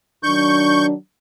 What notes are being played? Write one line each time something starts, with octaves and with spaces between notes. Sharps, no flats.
D#3 F#3 D4 C#6 G6